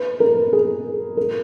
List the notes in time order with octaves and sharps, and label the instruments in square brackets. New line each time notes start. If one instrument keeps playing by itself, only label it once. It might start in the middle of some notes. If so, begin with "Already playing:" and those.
Already playing: [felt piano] B4
A#4
G#4
A#4